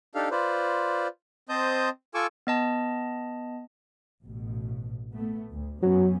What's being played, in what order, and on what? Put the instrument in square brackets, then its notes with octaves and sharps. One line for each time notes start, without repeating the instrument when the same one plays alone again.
[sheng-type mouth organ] D4 D#4 G4 A4 F5
F4 B4 C5 D5
C4 C5 D#5 A5 D#6 G6
F4 A4 G#5 C#6 D6 E6
[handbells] B3 D#5 A5
[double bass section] A1 B2
A3 B3
D2
[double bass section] F#2 B3 C#4 [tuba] F#3